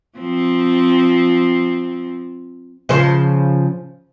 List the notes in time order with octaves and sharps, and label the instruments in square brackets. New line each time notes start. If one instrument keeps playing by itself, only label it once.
[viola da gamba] F3 C4
[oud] C#3 F3 C5